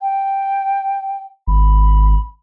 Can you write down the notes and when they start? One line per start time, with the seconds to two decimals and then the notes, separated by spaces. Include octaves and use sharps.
0.01 G5
1.47 G#1 B5